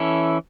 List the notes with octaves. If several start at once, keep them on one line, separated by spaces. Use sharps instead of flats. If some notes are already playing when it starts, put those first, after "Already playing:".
Already playing: E3 C#4 E4 A4